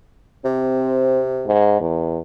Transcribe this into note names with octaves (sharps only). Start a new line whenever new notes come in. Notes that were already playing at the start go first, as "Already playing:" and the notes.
C3 C4
G#2
E2